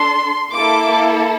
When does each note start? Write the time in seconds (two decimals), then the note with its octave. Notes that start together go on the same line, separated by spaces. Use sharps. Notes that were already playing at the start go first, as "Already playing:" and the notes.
Already playing: D4 A4 C6
0.53 A#3 E4 A4 D6